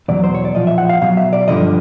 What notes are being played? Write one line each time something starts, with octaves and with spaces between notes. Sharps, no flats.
E2 B2 F#3 D5
C5
C#5
D5
A#2 F3 D#5
E5
F#5
F5
B2 F#3 F5
E5
D5
G2 D3 F3 D#5